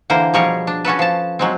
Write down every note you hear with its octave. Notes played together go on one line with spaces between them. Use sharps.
D3 E3 A#3 A#4 C5
B2 F3 G3 G#4 A#4 C#5
D4
C#4 F#4 A4 B4
F3 A5
F#3 G#3 C4